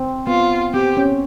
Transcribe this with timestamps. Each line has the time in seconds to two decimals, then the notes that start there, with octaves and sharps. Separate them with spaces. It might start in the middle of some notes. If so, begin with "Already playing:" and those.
Already playing: C4
0.27 B3 F4
0.74 C4 G4
0.97 C#4